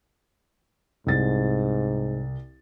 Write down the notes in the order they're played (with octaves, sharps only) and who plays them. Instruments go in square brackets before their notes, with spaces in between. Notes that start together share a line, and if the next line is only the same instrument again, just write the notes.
[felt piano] C2 A6 [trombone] G#2